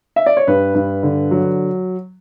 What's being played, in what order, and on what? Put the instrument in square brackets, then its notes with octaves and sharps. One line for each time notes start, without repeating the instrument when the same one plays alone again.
[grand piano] E5
D5
C#5
G2 B4
G2
D3
F#3